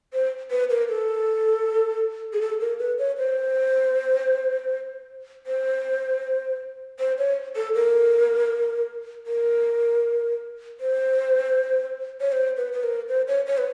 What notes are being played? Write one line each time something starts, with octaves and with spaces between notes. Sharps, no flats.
C5
B4
A#4
A4
G#4
A4
A#4
B4
C#5
C5
C5
C5
C#5
A4
A#4
A#4
C5
C#5
C5
B4
B4
A#4
C5
C#5
C#5
B4